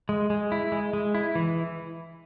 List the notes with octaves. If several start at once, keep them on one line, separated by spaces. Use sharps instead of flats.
G#3
G#3
E4
G#3
G#3
E4
E3